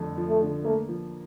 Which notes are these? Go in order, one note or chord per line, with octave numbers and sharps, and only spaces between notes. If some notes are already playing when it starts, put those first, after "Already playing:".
Already playing: F2 D3 A3
F3
A3
D3
A3 A#3
F3